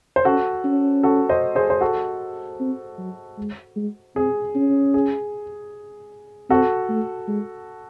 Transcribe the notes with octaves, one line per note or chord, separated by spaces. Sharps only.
C5
C#4 F#4 A4
C#4
F#4 A4
C5 D#5
G#4 C5
C5
F#4 A4
C4
F#3
G#3
G#3
C4 G#4
C#4
G#4
C4 F#4 A4
A3
G#3